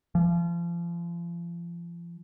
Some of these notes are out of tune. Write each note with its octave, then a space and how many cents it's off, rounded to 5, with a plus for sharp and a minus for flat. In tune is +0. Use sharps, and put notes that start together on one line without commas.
F3 -35